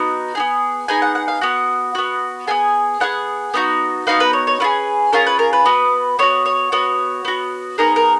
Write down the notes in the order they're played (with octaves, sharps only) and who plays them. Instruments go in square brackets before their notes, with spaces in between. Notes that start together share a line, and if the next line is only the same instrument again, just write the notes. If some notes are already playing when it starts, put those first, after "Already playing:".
Already playing: [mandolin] B3 D#4 F#4
B3 D#4 G#4
B3 D#4 G#4 G#5
F#5
F#5
F5
B3 F#4 F#5
B3 F#4
B3 F4 G#4 G#5
B3 F4 G#4 F#5
B3 D#4 F#4
B3 D#4 F#4 F5
B4
C#5
C#5
C#4 F4 B4
G#4
C#4 F4 G#4 A#4
B4
A#4
B4
B3 F#4
B3 F#4 C#5
C#5
B3 F#4 C#5
B3 F#4
B3 D#4 G#4 A#4
A#4